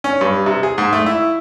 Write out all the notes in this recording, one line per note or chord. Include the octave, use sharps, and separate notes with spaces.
C#4
G2
C3
G#4
G#2
A3
E4